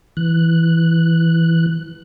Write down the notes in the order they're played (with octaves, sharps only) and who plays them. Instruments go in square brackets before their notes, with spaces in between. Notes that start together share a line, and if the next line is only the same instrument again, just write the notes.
[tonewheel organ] E3 F#6